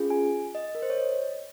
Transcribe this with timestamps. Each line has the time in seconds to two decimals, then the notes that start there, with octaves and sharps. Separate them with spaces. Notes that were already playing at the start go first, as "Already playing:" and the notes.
Already playing: C#4 F4 G#4
0.10 G#5
0.55 D#5
0.75 A#4
0.82 C5
0.90 C#5
0.98 D#5